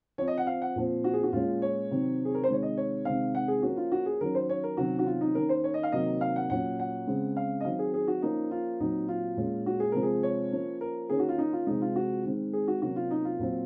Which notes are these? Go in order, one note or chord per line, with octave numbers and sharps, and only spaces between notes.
F3 C4 C#5
D#5
F#5
F5
F#5
A#2 F3 C4
F#4
G#4
F#4
A#2 G#3 C#4 F4
C#5
C3 D#3 F#3 C4
G#4
A#4
C5
C3 D#3 G#3 C#5
D#5
C#5
C3 D#3 G#3 C4 F5
F#5
G#4
F3 A#3 C#4 F#4
F4
F#4
G#4
D#3 F#3 C#4 A#4
C5
C#5
A#4
C3 D#3 F#3 C#4 F#4
F#4
F4
D#4
D#3 A#3 C#4 A#4
C5
C#5
D#5
F5
C3 D#3 F#3 A#3 D#5
F5
F#5
A#2 F#3 C#4 F#5
F#5
C#3 G#3 C4
F5
D#5
D#3 F#3 C4 F5
G#4
G#4
F#4
F3 A#3 C#4 D#4
F4
A#2 F#3 C4 D#4
F4
A#2 G#3 C#4
F#4
G#4
C3 F3 G#3 A#4
G#4
C#5
F3 A#3 C#4
A#4
D#3 A#3 C#4 G#4
F#4
F4
D#4
F4
C3 F3 G#3 D#4
F4
F#4
D#3 G#3 C4
G#4
F#4
C3 F#3 A#3 C#4 F#4
F4
D#4
F4
A#2 F#3 C4